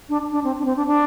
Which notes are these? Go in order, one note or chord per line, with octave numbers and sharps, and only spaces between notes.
D4
D4
C4
D4
C4
D4
D4